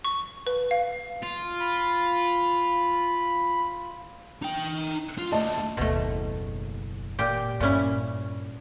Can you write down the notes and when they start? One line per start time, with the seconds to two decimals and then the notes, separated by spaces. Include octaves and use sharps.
0.05 C#6
0.47 B4
0.71 F5
1.23 F4
1.61 B5
4.43 D#4 G5
5.18 F4
5.32 D#2 A3 D#5 A5
5.77 F#1 D#2 B2 A3
7.19 A#2 G4
7.60 G2 A#2 C#4 E4